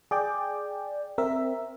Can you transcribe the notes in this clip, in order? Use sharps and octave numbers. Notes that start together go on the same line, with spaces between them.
G#4 D5 G5
C4 A#4 E5